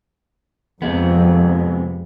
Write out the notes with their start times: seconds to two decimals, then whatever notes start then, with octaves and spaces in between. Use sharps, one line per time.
0.82 F2 C3 G#3 B3